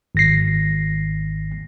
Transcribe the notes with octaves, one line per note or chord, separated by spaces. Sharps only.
G#1 A#6 C7